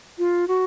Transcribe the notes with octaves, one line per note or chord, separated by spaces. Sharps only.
F4
F#4